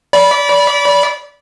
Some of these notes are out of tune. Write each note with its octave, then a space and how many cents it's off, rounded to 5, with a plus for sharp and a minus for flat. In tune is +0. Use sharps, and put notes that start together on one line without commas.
D5 -30 B5 -15